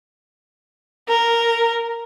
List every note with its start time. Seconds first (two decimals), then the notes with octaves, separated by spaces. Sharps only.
1.08 A#4